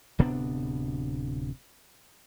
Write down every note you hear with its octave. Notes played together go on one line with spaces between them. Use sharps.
D1 C3 B3 D4